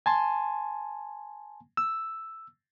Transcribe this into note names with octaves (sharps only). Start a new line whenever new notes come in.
G#5 A5 C6
E6